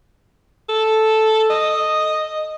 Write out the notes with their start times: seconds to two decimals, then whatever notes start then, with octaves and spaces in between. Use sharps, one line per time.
0.69 A4
1.50 D#5